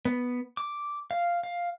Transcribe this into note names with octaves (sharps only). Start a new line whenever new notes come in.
B3
D6
F5
F5